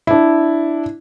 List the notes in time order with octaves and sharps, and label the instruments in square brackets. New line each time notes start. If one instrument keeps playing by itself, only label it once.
[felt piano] D4 E4